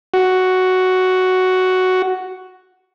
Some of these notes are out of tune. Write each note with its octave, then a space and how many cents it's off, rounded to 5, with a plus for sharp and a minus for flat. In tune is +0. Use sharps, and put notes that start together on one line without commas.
F#4 +5